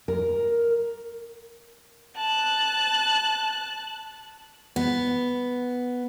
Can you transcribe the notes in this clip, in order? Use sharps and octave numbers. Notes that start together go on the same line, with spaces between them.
A#4
A5 F#6
B3